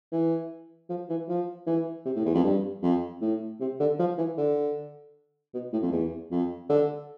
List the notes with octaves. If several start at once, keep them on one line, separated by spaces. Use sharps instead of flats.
E3
F3
E3
F3
E3
C3
A2
E2
F2
G2
F2
A2
C3
D3
F3
E3
D3
B2
A2
F2
E2
F2
D3